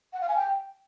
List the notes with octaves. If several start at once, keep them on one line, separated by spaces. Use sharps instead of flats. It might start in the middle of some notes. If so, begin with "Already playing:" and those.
F#5
F5
G#5
G5